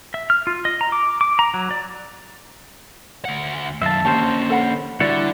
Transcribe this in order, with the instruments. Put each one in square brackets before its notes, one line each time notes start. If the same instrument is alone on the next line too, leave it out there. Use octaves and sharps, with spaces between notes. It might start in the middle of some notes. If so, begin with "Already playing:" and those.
[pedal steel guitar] E5
F6
F4
D#5
A#5
D6
D6
A#5
F#3
D5
[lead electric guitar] D2 F#5
[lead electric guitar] F#2 D#3 [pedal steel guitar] E5 A5 [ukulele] F5
[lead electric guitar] D3 A#3 [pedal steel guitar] C#4 C5 [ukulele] G4 A5
[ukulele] A4 F#5 B5
[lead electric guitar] D3 [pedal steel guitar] G3 E4 F#5 [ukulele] F#4 D5